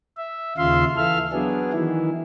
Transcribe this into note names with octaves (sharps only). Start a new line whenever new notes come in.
E5
D#2 C#3 F4 E5 F5 C6
E3 A4 E5 F5 F6
F#3 B3 D4 G#4
D#3 E3 E4